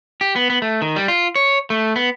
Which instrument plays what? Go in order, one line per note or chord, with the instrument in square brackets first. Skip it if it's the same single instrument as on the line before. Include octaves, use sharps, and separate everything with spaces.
[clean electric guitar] G4
B3
B3
A3
D#3
G3
F4
C#5
A3
B3